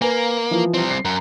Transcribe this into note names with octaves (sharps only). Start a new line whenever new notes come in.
A#3 B4 G#5
E3 F3
G3 C4
C7
F#2